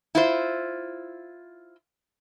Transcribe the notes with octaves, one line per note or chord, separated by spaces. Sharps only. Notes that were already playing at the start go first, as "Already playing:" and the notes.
E4 F4 C5